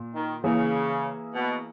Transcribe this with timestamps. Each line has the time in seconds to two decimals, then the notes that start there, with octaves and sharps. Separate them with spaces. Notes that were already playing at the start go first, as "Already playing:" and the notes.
Already playing: A#2
0.14 D#3
0.43 C#3 E3 A#3 E4 G#4
1.35 B2